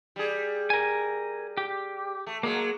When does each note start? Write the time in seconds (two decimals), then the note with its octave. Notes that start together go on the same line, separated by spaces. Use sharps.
0.16 G3 G#4
0.70 A#4 G#5
1.57 G4
2.27 A3
2.43 F#3 G#3 A#3